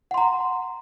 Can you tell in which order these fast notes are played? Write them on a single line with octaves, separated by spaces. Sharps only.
F#5 C6 A#5